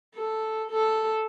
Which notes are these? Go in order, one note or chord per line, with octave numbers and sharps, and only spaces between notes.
A4
A4